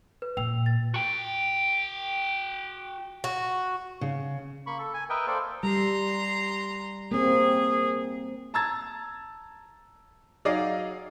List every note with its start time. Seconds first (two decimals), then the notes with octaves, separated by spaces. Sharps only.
0.22 B4
0.37 A#2 G5 E6 F7
0.66 A6
0.94 F#4 G5
3.24 F#4
4.01 C#3
4.66 A#3 B5 C#6
4.79 A4
4.94 G#5
5.10 A#4 B4 D#5 E5 G5
5.27 A#3 A4 C5 D5
5.63 G3 A#5 C6
7.11 A#3 C4 G#4
8.54 A5 A#5 E6 G#6 A6
10.45 F#3 D#4 G#4 D5 D#5 F5